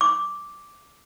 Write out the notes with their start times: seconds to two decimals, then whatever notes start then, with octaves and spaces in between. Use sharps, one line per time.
0.01 D6